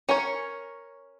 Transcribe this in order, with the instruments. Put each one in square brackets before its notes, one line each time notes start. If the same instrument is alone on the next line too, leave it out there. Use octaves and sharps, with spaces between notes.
[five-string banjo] C#4 A#4 C#5